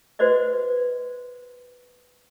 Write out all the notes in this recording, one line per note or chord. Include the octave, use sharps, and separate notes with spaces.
F#4 B4 C5 D5 D#5